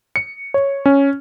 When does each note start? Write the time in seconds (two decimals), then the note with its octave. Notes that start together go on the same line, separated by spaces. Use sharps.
0.16 C#7
0.54 C#5
0.86 C#4